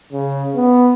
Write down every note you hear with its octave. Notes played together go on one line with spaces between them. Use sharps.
C#3
B3